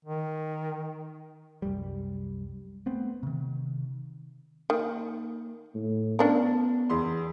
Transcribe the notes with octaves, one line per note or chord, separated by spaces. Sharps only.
D#3
C2 F#2 G3
A3 B3 C4
C3 D#3
D#3 A#3
A2
B3 C#4 D4 A#4
E2 C6